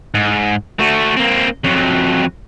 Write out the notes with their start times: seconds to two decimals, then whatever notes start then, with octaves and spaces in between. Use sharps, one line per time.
0.14 G#2
0.79 A3 F#4
1.17 A#3 C4
1.65 F2 F#3